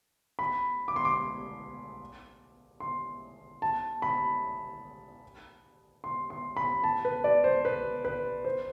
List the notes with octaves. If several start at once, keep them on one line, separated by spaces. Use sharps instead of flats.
B5
D6
C6
D6
C6
A5
B5
C6
C6
B5
A5
B4
D5
C5
B4
B4
C5